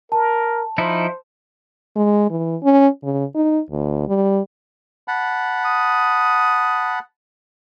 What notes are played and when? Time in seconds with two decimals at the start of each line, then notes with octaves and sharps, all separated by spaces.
0.12 A#4 A5
0.78 F3 D#4 E4 C5
1.96 G#3
2.30 E3
2.63 C#4
3.04 C#3
3.35 D#4
3.71 D2
4.08 G3
5.08 F#5 A5 B5
5.65 D#6